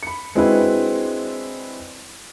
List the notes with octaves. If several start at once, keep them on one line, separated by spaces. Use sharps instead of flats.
B5 C#7
G#3 C4 D4 E4 F#4 B4